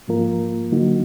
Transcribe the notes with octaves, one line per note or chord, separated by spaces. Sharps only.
G#2 F3 A#3 F4 A#4
D3 F#3 A#3 D#4 F#4